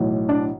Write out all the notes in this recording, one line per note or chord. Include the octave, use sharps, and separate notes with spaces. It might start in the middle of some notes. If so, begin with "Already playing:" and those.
Already playing: B1 A2 E3
D4 D5